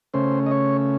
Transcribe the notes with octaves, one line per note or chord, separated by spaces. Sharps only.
C#3 A3 C#4 C5
D#5
C#5